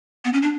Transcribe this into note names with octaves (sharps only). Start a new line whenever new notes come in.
B3
C#4
D4